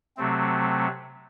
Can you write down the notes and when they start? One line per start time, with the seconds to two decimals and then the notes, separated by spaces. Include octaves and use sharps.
0.17 C3 F#3 A3 C4